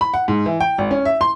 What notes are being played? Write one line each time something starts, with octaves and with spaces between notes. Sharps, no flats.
B5
F#5
G#2
E3
G5
G#1
C#4
E5
C6